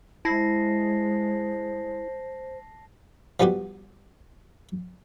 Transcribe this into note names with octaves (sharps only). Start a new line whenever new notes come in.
G#3 E4 C5 A5 A#6 C7
F3 G3 B3 F#4 G4